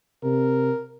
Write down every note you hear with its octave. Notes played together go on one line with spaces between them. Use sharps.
C3 A#4